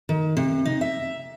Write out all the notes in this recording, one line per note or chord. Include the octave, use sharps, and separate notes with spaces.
D#3
C3
D#4
E5